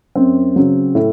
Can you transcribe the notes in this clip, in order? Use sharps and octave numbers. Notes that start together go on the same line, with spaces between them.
F#2 C4
C#3 F#3
A2